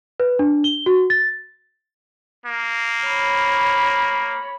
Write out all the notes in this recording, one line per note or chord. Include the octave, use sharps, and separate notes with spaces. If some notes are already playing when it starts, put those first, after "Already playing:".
B4
D4
G7
F#4
A6
A#3
C#5 B5